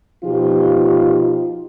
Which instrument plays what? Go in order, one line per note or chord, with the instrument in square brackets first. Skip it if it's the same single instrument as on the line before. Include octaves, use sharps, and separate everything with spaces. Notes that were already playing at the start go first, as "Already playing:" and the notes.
[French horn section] B2 F3 D#4 F4 G4